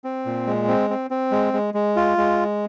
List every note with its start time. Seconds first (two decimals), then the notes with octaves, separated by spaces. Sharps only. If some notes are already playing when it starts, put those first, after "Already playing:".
0.04 C4
0.26 A#2
0.47 G#3
0.68 C4
0.90 C4
1.11 C4
1.32 G#3
1.53 G#3
1.74 G#3
1.96 F4
2.18 G#3